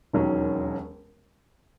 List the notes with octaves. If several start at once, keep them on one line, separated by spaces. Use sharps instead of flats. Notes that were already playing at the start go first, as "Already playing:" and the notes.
E1 D#2 D#3 F#3 C#4